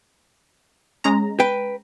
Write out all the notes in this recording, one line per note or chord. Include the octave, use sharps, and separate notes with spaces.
G#3 C#4 A#5
B4 G5